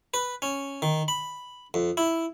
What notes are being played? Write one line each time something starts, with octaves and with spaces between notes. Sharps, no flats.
B4
C#4
D#3
B5
F2
E4